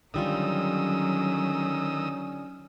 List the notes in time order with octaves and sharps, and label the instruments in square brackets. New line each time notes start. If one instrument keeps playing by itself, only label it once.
[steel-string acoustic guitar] D3 G3 F4 [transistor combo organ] D#3 D#6 E6 [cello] F#3 [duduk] C#4